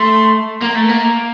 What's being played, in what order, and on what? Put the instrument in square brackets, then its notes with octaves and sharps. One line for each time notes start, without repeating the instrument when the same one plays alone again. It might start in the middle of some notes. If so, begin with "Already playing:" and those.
Already playing: [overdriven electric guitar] A3 [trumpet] C6
[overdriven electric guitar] A#3 [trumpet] A#5
[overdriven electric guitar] A3
A#3